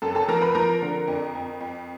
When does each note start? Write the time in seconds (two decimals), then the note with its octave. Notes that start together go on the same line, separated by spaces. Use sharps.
0.02 F#2 A4 A5
0.15 A4 A5
0.28 F3 A#4 A#5
0.42 B4 B5
0.55 F3 A#4 A#5
0.82 D3
1.08 F2
1.35 F2
1.60 F2